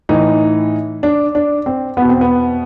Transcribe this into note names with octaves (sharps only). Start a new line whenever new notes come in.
A2 E3 D#4
D4
D4
C4
E2 B2 B3
C4
B3